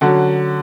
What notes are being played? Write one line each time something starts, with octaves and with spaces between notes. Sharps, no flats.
D3 F#3 C#4 F#4